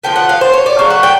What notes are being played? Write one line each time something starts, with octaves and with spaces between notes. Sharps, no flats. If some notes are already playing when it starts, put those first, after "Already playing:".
D3 F3 A3 G5
F#5
F5
C5
C#5
D5
C#3 F#3 A3 F5
F#5
G5